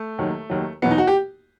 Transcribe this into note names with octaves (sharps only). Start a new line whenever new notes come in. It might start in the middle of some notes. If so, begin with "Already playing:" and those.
Already playing: A3
D#2 D#3 F#3
D#2 D#3 F#3
E2 B2 F#3 B3
D#4
F#4
G4